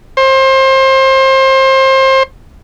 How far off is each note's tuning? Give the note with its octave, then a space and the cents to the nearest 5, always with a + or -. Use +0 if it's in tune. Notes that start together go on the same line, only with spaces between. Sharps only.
C5 +25